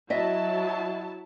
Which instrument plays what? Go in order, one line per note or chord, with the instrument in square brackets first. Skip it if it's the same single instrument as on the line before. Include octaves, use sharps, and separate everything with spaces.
[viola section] F#3 E4 A5 [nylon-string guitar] D#5 E5